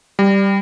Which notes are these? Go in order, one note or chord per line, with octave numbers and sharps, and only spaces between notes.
G3